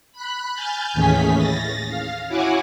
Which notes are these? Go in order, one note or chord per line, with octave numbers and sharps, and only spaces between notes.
B5 F#6
G#5 F6 G6 A6
D#2 A2 E3 C#4 G#4 B6
A6 A#6
F5
E4 F#4 C#5 F#5 G#5 D6